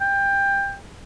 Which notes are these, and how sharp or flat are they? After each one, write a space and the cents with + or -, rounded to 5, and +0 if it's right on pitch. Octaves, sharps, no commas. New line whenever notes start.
G5 +20